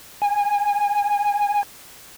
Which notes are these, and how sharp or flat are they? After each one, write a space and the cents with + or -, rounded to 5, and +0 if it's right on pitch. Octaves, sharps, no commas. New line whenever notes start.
G#5 -20